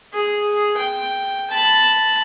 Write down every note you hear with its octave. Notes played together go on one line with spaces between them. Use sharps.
G#4
G5
A5 B5